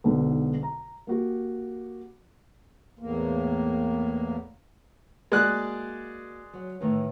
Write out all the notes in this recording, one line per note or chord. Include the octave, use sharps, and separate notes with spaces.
B1 G#2 B2 D3
A#5
A#3 F#4 G4
E2 A2 A#3
G#3 A#3 F#4 D5 F#6
F#3
A2 D#3 E3